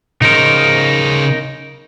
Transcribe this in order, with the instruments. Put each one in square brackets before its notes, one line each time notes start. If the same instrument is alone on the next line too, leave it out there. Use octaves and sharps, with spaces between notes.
[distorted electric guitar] C#3 C5 [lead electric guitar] D#4 A#4